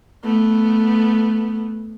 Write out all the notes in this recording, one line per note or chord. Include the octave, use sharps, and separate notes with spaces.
A3 B3